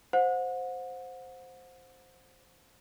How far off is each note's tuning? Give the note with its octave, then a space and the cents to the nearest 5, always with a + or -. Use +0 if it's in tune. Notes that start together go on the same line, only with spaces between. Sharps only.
C5 +0 F#5 -35